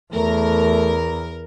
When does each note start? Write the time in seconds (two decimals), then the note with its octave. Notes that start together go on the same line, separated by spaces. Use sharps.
0.14 E2 A3 A#4